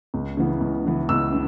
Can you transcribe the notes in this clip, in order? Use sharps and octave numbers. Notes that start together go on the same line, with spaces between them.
C#2
C#3 E3 B3
C#2
C#3 E3 B3
C#2 E6
C#3